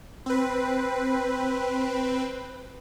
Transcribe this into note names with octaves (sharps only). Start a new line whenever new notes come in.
C4 B4